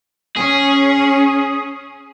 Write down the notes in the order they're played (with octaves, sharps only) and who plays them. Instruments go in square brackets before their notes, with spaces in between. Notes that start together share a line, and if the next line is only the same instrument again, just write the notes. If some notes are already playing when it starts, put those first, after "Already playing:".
[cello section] C#4 [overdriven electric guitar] G#4